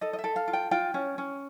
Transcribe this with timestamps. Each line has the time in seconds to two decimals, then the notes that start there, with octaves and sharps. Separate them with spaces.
0.01 A4 D#5
0.13 D#5
0.19 E5
0.24 A4
0.36 F5
0.48 F4
0.53 G5
0.71 F4 G5
0.94 C#4
1.18 C#4